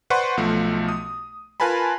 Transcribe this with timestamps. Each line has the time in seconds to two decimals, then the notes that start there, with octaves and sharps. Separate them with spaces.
0.10 B4 C5 D5 F#5 C6 C#6
0.37 B1 F3 A3
0.88 D#6
1.60 F4 A#4 B4 G#5 A5 B5